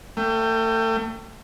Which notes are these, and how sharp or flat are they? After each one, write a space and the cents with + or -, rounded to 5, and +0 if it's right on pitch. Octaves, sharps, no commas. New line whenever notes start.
A3 +35 G5 +0